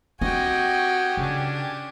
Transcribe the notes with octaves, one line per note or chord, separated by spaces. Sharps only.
C4 F#4 G4 D#5 G5 G#5
C#3 C#4 D4